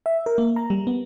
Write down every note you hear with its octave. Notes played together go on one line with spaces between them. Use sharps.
E5
A#4
A#3
A#5
G3
B3